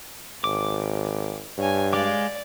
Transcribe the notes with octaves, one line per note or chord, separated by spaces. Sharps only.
G#1 D6
G2 C#5 G#5
G#3 D5 F5 D6